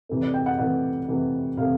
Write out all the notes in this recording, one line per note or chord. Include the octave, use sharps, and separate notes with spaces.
C3 E3 A3
D5
G5
F#5
C3 E3 A3 F#5
C3 E3 A3
C3 E3 A3 F5